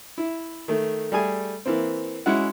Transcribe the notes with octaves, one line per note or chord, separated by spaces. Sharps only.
E4
D#3 A3
G3 A3 G#4 G#5
E3 A#3 C4
G#3 C#4 E4 F#4 F#5